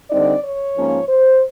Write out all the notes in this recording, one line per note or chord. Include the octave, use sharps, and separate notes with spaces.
D3 G3 C4 D#4 D5
C#5
G#2 F3 A#3 C#4
C5